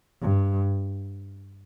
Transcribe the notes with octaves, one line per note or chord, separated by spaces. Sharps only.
G2